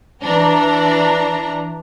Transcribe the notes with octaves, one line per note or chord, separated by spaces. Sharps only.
E3 D4 A#5